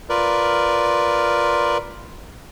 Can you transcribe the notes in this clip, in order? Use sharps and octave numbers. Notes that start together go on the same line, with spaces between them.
F4 A#4 B4 D5